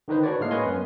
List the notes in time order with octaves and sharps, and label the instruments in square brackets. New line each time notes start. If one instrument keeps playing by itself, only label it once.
[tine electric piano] D3 D#3 D#4 B4 C5
D4 F#4 B4 C#5 D5
A2 G#3 A#3 F6 C7
B4 C#5 D#5 G#5 C6
F#2 B3